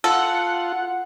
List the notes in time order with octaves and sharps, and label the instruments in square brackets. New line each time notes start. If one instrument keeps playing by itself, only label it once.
[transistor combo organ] F4 [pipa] A4 [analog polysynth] F#5